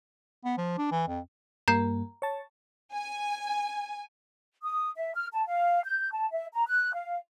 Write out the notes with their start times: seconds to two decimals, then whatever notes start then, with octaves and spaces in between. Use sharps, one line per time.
0.45 B3
0.57 F3
0.78 D4
0.91 E3
1.08 F2
1.68 G2 A#3 A#5 G6 C7
2.22 C#5 A5
2.93 G#5
4.63 D#6
4.96 E5
5.15 F6
5.33 A5
5.46 F5
5.85 G6
6.12 A5
6.32 E5
6.53 A#5
6.67 F#6
6.94 F5